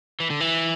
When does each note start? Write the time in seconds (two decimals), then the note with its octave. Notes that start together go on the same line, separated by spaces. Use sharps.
0.20 E3
0.30 D3
0.41 E3